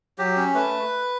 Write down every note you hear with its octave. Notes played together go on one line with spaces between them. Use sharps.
F#3 G4
C#4
A3 B4